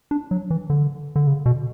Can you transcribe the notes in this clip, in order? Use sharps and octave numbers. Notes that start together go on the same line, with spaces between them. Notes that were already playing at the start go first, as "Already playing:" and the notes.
D4
F#3
E3
D3
D3
C#3
B2